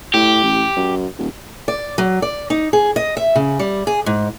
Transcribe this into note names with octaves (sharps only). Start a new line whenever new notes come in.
A2 G4
A1
F#2
D#1
D5
F#3
D5
D#4
G#4
D#5
E5
C#3
G3
G#4
G#2